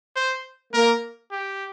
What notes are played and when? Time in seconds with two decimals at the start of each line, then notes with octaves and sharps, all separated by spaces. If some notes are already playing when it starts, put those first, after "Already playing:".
0.16 C5
0.74 A#3 A#4
1.31 G4